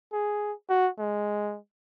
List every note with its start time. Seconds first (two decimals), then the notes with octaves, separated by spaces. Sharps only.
0.13 G#4
0.69 F#4
0.98 G#3